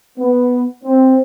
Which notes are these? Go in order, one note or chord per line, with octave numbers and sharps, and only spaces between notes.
B3
C4